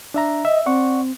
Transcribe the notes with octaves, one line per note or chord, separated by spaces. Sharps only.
D4 E5 A#5
D#5 E5
C4 D5 F#5 C#6